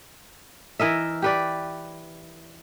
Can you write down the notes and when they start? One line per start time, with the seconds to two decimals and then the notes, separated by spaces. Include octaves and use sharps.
0.79 E3 A#4 D#5 E5
1.22 G4 B4 D5